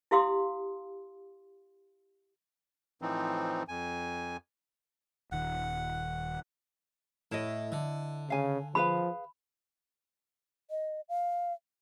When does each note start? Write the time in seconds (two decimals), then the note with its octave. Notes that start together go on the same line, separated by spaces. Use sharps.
0.11 E4 G4 F5 C6 D#6
3.02 A2 E3 F3 C4 D#4
3.68 F2 G#5
5.32 D#1 D#3 F#5
7.32 A2 E4 D#5
7.72 D3
8.30 C#3 F5 G#5
8.75 F3 G#4 B4 F5 B5
10.70 D#5
11.09 F5